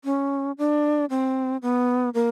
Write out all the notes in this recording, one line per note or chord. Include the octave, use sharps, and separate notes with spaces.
C#4
D4
C4
B3
A#3